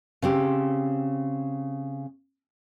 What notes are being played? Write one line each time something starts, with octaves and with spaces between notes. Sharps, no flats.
C#3 C4 G4